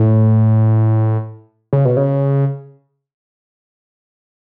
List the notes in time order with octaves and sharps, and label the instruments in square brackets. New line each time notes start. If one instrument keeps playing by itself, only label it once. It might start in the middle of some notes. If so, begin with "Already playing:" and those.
Already playing: [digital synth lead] A2
C#3
B2
C#3